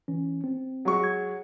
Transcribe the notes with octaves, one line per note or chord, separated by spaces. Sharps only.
E3 C#4
C4
F#3 G#3 C#6
G#6